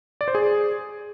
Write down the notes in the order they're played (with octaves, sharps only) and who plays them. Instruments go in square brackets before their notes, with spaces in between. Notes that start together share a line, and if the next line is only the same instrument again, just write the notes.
[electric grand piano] D5
C5
G#4